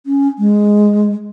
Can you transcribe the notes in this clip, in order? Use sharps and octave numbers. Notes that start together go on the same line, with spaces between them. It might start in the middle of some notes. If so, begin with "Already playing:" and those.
C#4
G#3